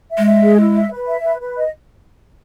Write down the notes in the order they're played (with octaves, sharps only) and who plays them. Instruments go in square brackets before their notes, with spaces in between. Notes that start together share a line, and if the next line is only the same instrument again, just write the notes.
[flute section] E5
[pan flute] G#3
[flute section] E5
G#4
E4
E5
B4
E5
B4
B4
D#5